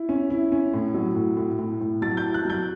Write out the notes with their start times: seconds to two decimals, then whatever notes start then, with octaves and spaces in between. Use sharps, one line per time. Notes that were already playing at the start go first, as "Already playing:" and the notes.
Already playing: E4
0.09 C#4
0.30 E4
0.52 C#4
0.73 A2
0.94 F#3
1.16 A2
1.37 A2
1.59 A2
1.81 A2
2.01 F#3 A6
2.17 G6
2.24 E4
2.34 F#6
2.45 F#3 G6